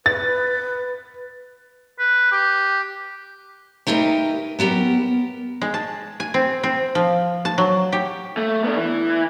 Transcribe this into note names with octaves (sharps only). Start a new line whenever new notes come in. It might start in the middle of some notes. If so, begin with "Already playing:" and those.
B4 A6
B4
G4
A3 D#4 G4 A#4 B4
F#3 B3 G4 A#4
G#3
A5
G#5
C4
C4
F3
A5
F#3
G4
A3
B3 D4
E3